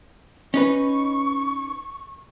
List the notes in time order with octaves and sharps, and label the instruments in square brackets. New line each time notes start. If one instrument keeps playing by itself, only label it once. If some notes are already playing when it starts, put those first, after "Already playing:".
[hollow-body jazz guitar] C#4 D#4 B4 [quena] C#6